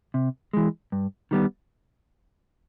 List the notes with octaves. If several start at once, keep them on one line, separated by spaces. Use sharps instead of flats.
C3
E3 G#3
G2
D#3 G3 B3